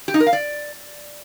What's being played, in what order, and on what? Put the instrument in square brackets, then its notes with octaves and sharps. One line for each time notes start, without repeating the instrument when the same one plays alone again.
[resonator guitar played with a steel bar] G4
D#4
A#4
F5
D5